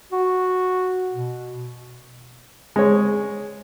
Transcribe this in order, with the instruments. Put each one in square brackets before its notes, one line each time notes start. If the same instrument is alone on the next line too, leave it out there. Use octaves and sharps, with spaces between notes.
[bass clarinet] F#4
B2
[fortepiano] G#3 C#5